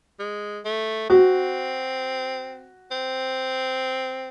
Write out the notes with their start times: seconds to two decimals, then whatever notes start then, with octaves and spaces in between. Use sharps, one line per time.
0.19 G#3
0.65 A3
1.10 C4 F#4
2.91 C4